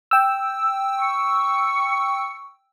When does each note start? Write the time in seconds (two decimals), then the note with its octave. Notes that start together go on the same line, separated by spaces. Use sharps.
0.11 G5 E6
0.99 C#6